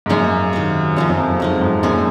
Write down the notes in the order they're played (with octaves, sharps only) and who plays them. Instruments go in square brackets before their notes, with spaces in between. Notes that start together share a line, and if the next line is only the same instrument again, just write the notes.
[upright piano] G#2
[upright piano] F#2 [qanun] A#3 C#4 G#4
[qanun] C3 D#3 F#3
[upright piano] F#2 [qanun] C3 F3 C4
[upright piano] F#2
F2
F2
[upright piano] F#2 [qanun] G#3 D#4 F#4
[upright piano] F2 G#2
[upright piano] F#2 A#2 [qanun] G#3 C#4 G#4